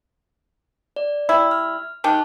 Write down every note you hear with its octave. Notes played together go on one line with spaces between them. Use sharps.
D5
G3 E4
F6
D#3 G4 A5 F#6